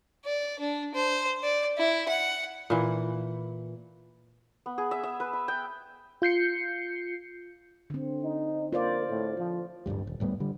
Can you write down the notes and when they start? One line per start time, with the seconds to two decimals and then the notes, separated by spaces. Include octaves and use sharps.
0.25 D5
0.59 D4
0.94 C5
1.43 D5
1.78 E4
2.08 F#5
2.70 A#2 E3
4.66 B3
4.78 G#4
4.91 E5
5.03 E5
5.20 B4
5.33 E6
5.48 G5
6.22 F4 G6 C7 C#7
7.90 D3 C4
8.22 D#4
8.73 A#3 F4 C5 D5
9.09 A2
9.37 F3
9.86 D1 B1 G2 G3
10.07 D#1
10.20 D1 A2 G3 B3
10.40 D3 G3